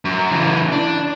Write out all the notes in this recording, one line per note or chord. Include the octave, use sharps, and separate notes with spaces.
F#2
C#3 E3
D4